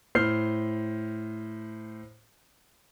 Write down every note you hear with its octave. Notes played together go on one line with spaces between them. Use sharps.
A2 C5 F6 G6 C7